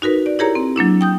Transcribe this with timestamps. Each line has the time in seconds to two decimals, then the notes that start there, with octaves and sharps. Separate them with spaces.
0.02 D#4 F#4 A#4 B4
0.26 D5
0.39 E4 G4 G#4 A#4 C#5 A#5
0.55 C4
0.76 F#3 A#3 D4 E4
1.01 G5 D#6 G6